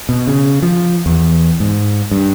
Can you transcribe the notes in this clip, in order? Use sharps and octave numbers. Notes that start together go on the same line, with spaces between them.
B2
C#3
F3
E2
G#2
G2